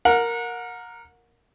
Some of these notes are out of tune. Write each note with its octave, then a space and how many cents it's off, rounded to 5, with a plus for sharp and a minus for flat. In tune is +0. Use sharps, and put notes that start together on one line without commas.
A#4 +0 F#5 -30